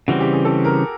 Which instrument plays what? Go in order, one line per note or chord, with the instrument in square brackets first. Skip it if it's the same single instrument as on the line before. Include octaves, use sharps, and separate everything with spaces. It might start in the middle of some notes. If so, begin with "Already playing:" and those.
[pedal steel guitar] C#3 E3 G3 C4 [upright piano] F#4
[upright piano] G4
G#4
A4
A#4